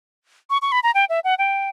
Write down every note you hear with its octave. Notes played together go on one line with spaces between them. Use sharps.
C#6
C#6
B5
A#5
G5
E5
F#5
G5